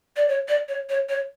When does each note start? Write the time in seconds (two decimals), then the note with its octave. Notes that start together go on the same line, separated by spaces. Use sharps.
0.16 D5
0.28 C#5
0.48 D5
0.68 C#5
0.89 C#5
1.09 C#5